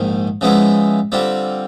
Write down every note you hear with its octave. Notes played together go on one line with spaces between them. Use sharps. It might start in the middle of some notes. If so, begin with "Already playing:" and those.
Already playing: A#1 G#2 D#3
C#3 F3 G#3 B3 E4
D3 G3 C4 F4